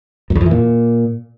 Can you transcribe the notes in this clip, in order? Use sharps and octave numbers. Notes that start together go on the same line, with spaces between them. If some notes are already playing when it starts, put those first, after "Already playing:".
F#2
E2
F2
E3
A#2